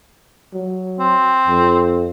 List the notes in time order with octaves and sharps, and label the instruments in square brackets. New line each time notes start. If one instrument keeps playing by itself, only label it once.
[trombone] F#3
[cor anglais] C4
[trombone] F2